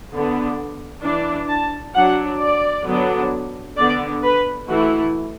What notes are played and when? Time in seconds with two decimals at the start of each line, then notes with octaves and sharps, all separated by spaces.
0.13 D3 B3 D4
1.03 E3 D4
1.49 A5
1.95 F#3 D4 F#5
2.40 D5
2.86 D3 F#3 B3 D4
3.77 D3 B3 D4 D5
4.23 B4
4.69 E3 A3 E4 F#4